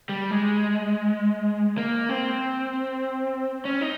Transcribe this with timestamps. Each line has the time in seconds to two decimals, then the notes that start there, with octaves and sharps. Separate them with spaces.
0.09 G3
0.31 G#3
1.78 A#3
2.09 C4
3.65 C#4
3.81 D#4